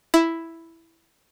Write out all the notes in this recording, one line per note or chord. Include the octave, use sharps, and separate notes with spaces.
E4